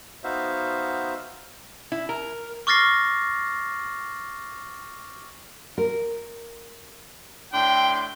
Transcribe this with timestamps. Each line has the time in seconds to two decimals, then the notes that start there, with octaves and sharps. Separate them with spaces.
0.24 B3 D#4 F#4 C5 E5 F5
1.92 E4
2.09 A#4
2.67 C#6 D6 F6 A6 A#6 C7
5.78 A#4
7.53 A2 D4 G5 C6